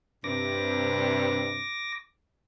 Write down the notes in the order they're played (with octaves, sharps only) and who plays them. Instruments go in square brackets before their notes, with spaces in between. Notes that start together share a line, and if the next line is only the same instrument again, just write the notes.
[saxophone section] G2 C3 [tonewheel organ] D6 A#6